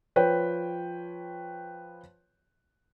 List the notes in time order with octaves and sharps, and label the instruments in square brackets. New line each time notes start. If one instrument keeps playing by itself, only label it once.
[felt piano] F3 B4 C#5 G5